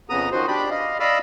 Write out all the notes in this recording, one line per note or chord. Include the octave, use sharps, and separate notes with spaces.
F2 C#3 B3 A#5 D#6
D#3 F3 F#4 C5
D4 G4 B5
D#5 F5
D5 D#5 F5 B5 E6